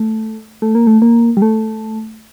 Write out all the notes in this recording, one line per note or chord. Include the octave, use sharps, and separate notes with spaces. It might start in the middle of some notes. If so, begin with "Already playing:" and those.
Already playing: A3
A3
A#3
A3
A#3
G3
A3